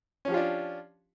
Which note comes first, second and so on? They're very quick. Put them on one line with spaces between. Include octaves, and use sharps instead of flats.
C#4 F3 G4 F4 D4